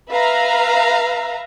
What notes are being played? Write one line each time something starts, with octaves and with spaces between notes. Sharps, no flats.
B4 E5 F5 A#5